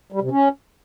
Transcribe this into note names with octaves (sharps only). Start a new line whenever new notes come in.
G3
C3
C#4